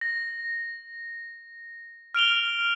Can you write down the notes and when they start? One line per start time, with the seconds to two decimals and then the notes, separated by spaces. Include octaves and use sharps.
0.01 A#6
2.15 F6 D7 F7 G7